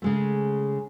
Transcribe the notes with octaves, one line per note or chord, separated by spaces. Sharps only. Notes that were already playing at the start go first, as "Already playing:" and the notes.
C#3 G#3 A3